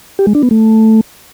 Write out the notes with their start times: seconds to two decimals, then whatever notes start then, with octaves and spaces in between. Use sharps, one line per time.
0.19 G4
0.27 G#3
0.35 D4
0.43 B3
0.51 A3